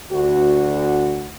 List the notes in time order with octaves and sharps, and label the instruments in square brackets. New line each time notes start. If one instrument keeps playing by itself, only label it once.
[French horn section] D2 F#4